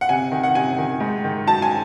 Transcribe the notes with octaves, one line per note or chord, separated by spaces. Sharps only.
F#5
C3 G#5
D#3
F#5
C3 G#5
D#3
G#2
D#3
F#3 A5
G#5